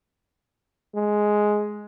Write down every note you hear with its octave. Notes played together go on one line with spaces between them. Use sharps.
G#3